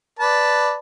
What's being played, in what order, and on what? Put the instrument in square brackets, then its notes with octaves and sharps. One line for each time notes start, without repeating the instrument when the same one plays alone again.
[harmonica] B4 D5 A5